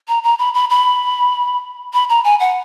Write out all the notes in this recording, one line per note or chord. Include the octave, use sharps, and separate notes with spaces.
A#5
A#5
B5
B5
B5
B5
A#5
G#5
F#5